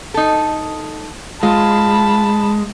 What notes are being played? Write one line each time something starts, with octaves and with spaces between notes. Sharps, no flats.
D#4 A4
G#3 F4 A5 B5